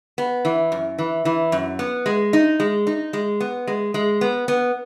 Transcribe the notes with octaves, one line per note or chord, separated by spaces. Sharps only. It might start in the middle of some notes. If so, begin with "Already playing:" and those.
B3
E3
F#2
E3
E3
F#2
B3
G#3
D#4
G#3
D#4
G#3
B3
G#3
G#3
B3
B3